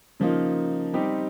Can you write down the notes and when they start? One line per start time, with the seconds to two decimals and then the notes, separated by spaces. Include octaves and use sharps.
0.20 C#3 F3 A#3 D#4
0.94 G3 C4 D#4 G4